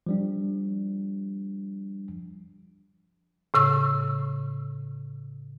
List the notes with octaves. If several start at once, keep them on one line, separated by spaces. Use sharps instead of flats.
F3 G3 D4
A2 C#3 C#6 E6